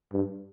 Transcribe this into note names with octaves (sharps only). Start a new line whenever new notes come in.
G2